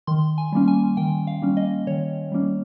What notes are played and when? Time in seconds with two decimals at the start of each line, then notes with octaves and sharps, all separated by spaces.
0.07 D#3 C6
0.38 G#5
0.52 G3 A#3 C#4
0.68 G#5
0.97 D#3 G5
1.27 F5
1.42 G3 A#3 C#4
1.57 D#5
1.87 D#3 C#5
2.32 G3 A#3 C#4